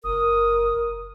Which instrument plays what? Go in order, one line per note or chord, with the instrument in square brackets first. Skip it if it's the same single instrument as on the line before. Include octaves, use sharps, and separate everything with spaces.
[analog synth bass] F#1 [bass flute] A#4 [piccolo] D#6